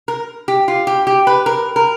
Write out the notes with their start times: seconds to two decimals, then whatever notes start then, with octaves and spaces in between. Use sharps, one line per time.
0.08 A#4
0.48 G4
0.68 F4
0.87 G4
1.07 G4
1.27 B4
1.46 A#4
1.76 A#4